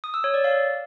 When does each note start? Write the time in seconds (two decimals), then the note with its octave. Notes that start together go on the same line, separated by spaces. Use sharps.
0.04 D#6
0.14 E6
0.24 C#5
0.34 D5
0.44 F5